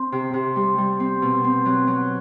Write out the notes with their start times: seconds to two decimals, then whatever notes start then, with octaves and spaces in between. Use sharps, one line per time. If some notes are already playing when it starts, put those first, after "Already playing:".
Already playing: C4
0.12 C3
0.34 C3
0.56 G3
0.78 G3
1.00 C4
1.22 B2
1.44 C4
1.65 F#3
1.87 F#3